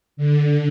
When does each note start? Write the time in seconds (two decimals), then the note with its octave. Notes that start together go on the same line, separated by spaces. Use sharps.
0.17 D3